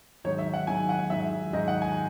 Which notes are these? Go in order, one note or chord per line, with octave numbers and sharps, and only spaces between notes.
G#2 D#3 F#3 C#5
E5
F#5
G#2 D#3 F#3 G#5
F#5
G#2 D#3 F#3 E5
G#2 D#3 F#3 D#5
F#5
G#5